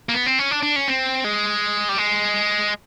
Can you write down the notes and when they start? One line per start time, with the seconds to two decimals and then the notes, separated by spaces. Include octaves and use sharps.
0.09 A#3
0.14 B3
0.26 C4
0.39 C#4
0.51 D4
0.63 D4
0.76 C#4
0.88 C4
1.24 G#3
1.89 G3
1.98 G#3